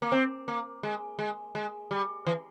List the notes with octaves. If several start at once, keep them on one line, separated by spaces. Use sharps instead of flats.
A#3
C4
A#3
G#3
G#3
G#3
G3
E3